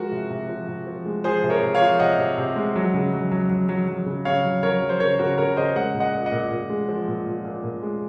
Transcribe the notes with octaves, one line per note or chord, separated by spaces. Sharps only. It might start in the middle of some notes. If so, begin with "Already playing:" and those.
Already playing: F3 G#3 F#4 A#4
C3
C3
F3
C3
F3
G#3
F3 G#4 C5
C3
A#4 C#5
C3
C#5 F5
F3
C3 D#5 F#5
C3
C3
G#3
F#3
C#3
F#3
F#3
F#3
F#3
F#3
C#3
C#3 C#5 F5
F#3
F#3 A#4 C#5
F#3
C5
C#3 A#4 C#5
C#3 F#4 A#4
C#3 A#4 C#5
C#3 C5 D#5
G#3 D#5 F#5
A#2
D#5 F#5
A#2
D#5 F#5
A#2
A#2
G#3
F3
A#2
A#2
A#2
A#2
G#3